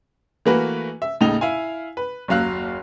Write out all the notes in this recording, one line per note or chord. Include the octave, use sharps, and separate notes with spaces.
E3 A3 A#3 F#4 B4
E5
D#2 A2 C#3 D#4 F7
E4 F5 G#5
B4
F#1 D#2 F#3 F5 F#6